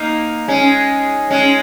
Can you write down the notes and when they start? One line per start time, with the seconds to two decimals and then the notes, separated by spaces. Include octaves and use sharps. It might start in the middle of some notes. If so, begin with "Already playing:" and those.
Already playing: A#3 D#4
0.48 G#3 C#4
1.30 G#3 C#4